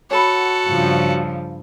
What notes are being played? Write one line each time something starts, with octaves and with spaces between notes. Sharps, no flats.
F#4 A4 C#5 F#5 B5
G2 C#3 F3